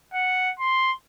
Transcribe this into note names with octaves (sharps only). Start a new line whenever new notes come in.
F#5
C6